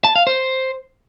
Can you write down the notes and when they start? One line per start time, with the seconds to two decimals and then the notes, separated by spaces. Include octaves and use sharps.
0.04 A5
0.16 F5
0.27 C5